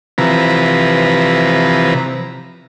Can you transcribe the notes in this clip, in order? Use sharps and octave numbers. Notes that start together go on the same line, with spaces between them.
C3 E3 F3 B4 A#5